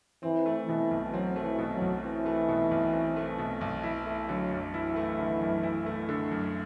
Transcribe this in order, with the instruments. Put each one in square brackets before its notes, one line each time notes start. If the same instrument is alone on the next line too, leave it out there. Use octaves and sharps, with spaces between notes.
[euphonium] E3 [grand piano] C4
[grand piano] A3
[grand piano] B2 [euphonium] E3
[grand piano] B1
[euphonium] F#3 [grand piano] C4
[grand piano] A3
[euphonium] E3
[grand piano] B2
[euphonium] F#3
[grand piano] B1
[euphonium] E3 [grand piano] C4
[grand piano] A3
B2
B1
C4
A3
B2
B1
[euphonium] E3 [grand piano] E4
[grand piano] A3
[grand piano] D3 [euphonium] F#3
[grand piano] F#2
[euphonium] E3 [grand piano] E4
[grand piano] A3
D3
F#2
E4
A3
D3
F#2